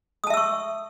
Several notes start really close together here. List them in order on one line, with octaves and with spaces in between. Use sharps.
D#6 A5 E5 E6 C#6